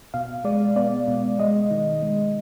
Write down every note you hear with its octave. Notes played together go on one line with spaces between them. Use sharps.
B2 F5
G#3 D5
B3 D5
B2
G#3 D#5
D#3
G#3